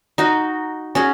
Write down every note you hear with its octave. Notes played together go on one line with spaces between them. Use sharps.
D#4 F#4
C#4 F#4 G#4